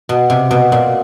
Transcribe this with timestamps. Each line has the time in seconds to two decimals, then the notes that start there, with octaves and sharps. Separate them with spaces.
0.09 B2
0.30 C3
0.51 B2
0.72 A#2